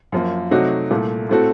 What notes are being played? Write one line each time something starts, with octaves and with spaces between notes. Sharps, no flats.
F#2 F3 A#3
C3 F#3 A3 D#4 F#4
C2 A#2 A3
A2 A3 C4 F#4 A4